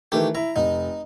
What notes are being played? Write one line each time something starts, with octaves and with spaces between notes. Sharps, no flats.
D#3 E3 A3 G4
E4 A#5
F1 D#4